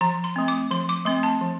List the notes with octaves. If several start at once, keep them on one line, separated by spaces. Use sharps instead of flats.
F3 A#5
C6
A3 C4
D6
F3 C6
D6
A3 C4 C6
A5
F3